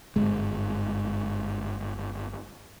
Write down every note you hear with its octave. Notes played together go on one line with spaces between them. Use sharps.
G1 G#2 G#3